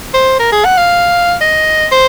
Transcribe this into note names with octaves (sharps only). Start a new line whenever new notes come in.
C5
A#4
G#4
F#5
F5
D#5
C5